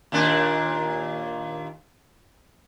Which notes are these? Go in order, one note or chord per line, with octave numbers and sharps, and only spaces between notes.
D#2 A#2 D4